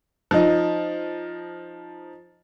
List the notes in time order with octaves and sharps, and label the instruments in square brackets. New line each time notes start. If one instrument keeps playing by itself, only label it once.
[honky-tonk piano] F3 D#4